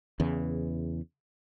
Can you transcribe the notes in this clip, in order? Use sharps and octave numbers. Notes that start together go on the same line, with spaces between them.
E2 C#3 E3